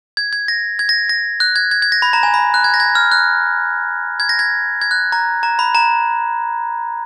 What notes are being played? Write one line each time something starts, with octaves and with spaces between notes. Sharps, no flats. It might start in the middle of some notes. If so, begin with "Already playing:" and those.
G#6
G#6
A#6
G#6
A#6
A#6
F#6
G#6
G#6
G#6
A#6
B5
A#5
G#5
B5
F#6
G#6
A#6
G#6
F6
F#6
G#6
A#6
G#6
G#6
F#6
A#5
A#5
B5
A#5